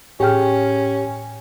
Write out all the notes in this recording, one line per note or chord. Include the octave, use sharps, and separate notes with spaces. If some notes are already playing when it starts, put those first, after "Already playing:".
A2 C#4 G4 G#4 G5 F6